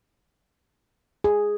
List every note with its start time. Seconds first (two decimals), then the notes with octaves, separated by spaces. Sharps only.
1.24 G#4